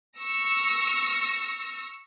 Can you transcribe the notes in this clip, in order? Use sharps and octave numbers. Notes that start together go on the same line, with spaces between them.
C#6 E6 F6 A#6